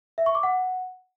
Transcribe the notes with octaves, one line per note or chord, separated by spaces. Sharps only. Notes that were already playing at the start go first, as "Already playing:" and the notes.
E5
C#6
D6
F#5